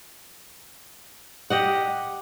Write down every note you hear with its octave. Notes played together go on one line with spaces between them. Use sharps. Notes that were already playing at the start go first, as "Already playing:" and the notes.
G4 D#5 F#5